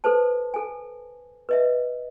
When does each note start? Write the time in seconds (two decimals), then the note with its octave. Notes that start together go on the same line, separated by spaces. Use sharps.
0.04 A4 B4 C5 A5
0.54 A4 G#5
1.49 B4 D#5 E5